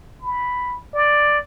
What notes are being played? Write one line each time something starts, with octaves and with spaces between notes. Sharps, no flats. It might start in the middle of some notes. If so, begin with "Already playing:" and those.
B5
D5